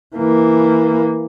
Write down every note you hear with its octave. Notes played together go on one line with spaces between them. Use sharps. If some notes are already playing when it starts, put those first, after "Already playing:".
E3 A#3